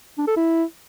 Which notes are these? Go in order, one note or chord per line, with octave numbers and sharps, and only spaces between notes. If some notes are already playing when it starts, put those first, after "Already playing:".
D4
A4
E4